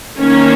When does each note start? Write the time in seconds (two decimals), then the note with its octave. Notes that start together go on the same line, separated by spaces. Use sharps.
0.19 D#3 A#3 C#4